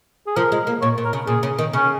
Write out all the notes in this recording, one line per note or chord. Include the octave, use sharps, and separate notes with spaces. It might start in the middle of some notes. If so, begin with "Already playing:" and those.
G#4
F3 A#4
G#3
A#3
A#2 C#5
A#2
A#4
C#3
A#2 G#4
C#3
D#3
C#3 C#4